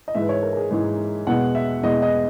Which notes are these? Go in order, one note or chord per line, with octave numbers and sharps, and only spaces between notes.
D#5
G#2 E3 G#3 E5
B4
C#5
A#4
A#4
G#4
G#2 E3 G#3
E2 B2 G#3 F#5
E5
E2 B2 G#3 D#5
D#5